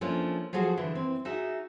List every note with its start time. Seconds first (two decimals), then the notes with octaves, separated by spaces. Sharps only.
0.01 F3 A3 A#3 C#4 D4
0.53 F3 F#3 F4 F#4 G#4 A4
0.77 D3 E3
0.95 C4
1.25 D#4 F#4 G#4 E5